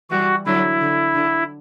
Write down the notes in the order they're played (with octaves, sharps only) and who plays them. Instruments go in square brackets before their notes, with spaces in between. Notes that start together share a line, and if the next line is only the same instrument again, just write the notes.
[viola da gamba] E3 G3 [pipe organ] F#4
[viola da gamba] D3 F#3 [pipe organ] E4
[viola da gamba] D3
D3